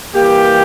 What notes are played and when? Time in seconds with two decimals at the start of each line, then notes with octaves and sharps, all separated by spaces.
0.14 E3 G3 A#3 G4